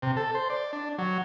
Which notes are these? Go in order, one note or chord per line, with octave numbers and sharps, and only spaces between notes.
C3
A4
C5
D5
D4
F#3